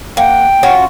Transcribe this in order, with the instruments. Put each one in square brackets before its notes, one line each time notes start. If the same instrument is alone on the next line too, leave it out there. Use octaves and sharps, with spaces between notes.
[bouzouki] A#3 F#5 [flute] G5
[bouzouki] C#4 F4 F#4